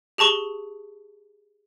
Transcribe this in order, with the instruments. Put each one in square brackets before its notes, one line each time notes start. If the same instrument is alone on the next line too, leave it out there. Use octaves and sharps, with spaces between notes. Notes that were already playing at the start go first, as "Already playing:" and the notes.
[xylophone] G4 G#4 A5 C#6 G7